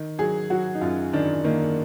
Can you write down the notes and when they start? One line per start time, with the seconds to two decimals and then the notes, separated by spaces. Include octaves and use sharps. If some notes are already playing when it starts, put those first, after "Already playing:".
Already playing: D#3
0.19 F#3 G#4
0.50 F#3 F#4
0.75 D#4
0.81 F#2 F4
1.13 D#3 D4
1.44 D#3 A#3